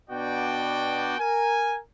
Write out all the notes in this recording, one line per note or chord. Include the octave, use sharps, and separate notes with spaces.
B2 B3 D4 F#4 D5 G5
A#4 G#5